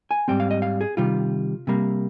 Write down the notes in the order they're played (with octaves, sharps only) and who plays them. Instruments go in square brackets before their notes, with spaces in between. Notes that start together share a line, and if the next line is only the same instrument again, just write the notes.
[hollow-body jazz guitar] G#5
G#2 G3 C4 G5
F5
D#5
F5
G#4
C3 D#3 G3 F4
C3 G3 A#3